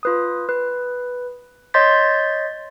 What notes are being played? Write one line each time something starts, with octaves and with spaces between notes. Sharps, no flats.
F4 B4 D#6
B4
C#5 D#5 C6 G6 A6 B6